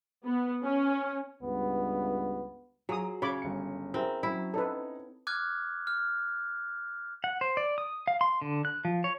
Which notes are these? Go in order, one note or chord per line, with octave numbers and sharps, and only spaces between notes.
B3
C#4
C#2 G2 B3
F#3 F4 G#4 A#5 D#6
C#3 C#5 B5 D6
G1 C#7
C4 E4 G#4 A#4
F#3 C#4 E4
C#4 D#4 A4 B4 C#5
D6 F6 F#6 G#6
F6
F#5
C5
D5
D#6
F5
C6
D3
F#6
F3
C#5